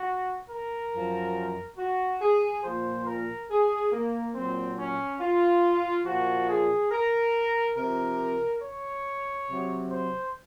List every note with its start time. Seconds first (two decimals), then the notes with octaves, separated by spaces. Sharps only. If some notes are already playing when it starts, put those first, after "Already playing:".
Already playing: F#4
0.50 A#4
0.93 F#2 F3
1.78 F#4
2.21 G#4
2.64 A#2 F3 C5
3.07 A#4
3.49 G#4
3.92 A#3
4.35 A#2 F#3 C4
4.78 C#4
5.21 F4
6.06 A#2 F3 F#4
6.49 G#4
6.91 A#4
7.76 C3 F3 A#4
8.62 C#5
9.48 C3 F#3
9.90 C5